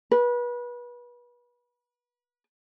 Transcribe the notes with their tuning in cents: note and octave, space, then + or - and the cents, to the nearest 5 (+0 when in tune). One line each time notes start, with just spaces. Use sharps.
B4 -30